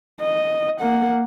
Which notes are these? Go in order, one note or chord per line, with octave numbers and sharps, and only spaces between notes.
D#5
A#3 F#5